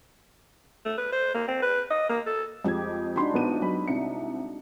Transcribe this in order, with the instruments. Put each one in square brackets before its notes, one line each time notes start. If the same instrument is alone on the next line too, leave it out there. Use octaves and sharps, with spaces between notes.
[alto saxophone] A3
B4
C5
A#3
C4
B4
D#5
A#3
A4
[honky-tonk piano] F2 G#6 [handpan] G#3 G4
[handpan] D4 D#4 F#4 [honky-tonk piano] B5 C6
[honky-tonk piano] A#1 B3 D#7
F#3 B3 B5
C2 C3 C#7